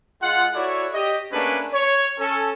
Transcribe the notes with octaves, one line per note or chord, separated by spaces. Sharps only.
G#3 F4 F#5
E4 F#4 A4 C#5 D5
G4 D#5
A3 A#3 C#4 D4 G#4 B4
C#5
C#4 A4